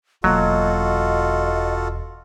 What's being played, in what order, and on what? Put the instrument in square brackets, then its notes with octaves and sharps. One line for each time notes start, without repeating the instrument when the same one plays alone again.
[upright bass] E1 A#3 [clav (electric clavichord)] F#3 [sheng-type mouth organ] F4 F#4 A4 [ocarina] D#5